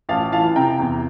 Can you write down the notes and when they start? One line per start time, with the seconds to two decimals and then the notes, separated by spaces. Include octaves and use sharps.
0.09 A1 F5 A5
0.32 E3 F5 A5
0.56 C3 G5 A#5
0.79 E2